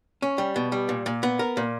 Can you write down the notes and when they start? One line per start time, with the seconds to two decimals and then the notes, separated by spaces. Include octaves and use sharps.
0.22 C#4
0.38 G3
0.56 B2
0.72 G3
0.89 A#2
1.06 A#2
1.23 B3
1.39 A#4
1.57 A#2